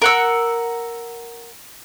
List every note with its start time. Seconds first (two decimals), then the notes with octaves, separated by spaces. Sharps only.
0.02 A#4 F#5 E6